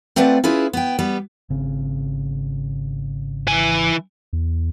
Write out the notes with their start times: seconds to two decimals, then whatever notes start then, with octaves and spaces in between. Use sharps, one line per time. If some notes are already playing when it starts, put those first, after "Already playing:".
0.16 A3 C4 F4 B4 D5 F#5
0.44 C#4 E4 F4 G#4 B4
0.73 B3 G5
0.99 G3 B3
1.50 G#1 C#3 C4
3.47 E3 G#5
4.33 E2